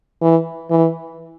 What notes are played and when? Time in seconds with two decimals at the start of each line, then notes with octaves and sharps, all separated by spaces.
0.21 E3
0.70 E3